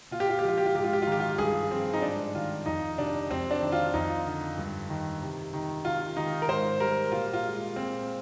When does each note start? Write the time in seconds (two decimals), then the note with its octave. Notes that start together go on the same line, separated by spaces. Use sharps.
0.11 A#2 F4
0.20 G4
0.29 F4
0.39 G4
0.44 F3 F4
0.58 G4
0.66 F4
0.75 G#2 G4
0.84 F4
0.93 G4
1.02 F4
1.07 D#3
1.12 G4
1.20 F4
1.38 G2 G#4
1.71 F3 C4
1.93 D#4
2.02 G#2 D4
2.35 D#3 F4
2.66 F2 D#4
2.98 C3 D4
3.30 F2 C4
3.51 D4
3.61 D#3
3.72 F4
3.94 F2 D#4
4.25 D3
4.58 G2
4.89 D#3
5.22 C3
5.53 D#3
5.85 C3 F4
6.17 D#3 D#4
6.42 A#4
6.48 G#2 C5
6.80 G3 A#4
7.11 A#2 F4
7.33 F4
7.43 G#3
7.76 A#2 C4